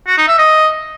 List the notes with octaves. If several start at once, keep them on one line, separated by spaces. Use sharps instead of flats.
F#4
D#4
E5
D#5